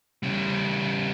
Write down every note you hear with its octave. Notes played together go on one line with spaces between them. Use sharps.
C#3 G3